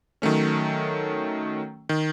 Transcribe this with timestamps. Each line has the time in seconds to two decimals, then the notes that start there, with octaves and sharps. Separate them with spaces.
0.22 D#3 F#3 A3 C#4
1.89 D#3